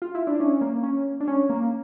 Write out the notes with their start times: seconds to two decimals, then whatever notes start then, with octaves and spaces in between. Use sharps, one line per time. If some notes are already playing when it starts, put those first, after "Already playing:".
0.02 F4
0.15 E4
0.27 D4
0.40 C#4
0.61 A#3
0.83 C#4
1.20 D4
1.28 C#4
1.50 A#3